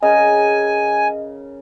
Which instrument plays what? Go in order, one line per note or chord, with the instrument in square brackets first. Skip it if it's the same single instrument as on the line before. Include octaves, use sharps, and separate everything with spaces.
[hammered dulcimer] C#3 A#4 [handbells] D#5 [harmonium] G#5